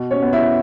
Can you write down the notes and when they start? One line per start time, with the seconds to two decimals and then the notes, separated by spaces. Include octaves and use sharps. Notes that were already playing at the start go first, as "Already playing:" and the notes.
Already playing: B2
0.11 C#4 C#5
0.22 B3
0.33 E4 E5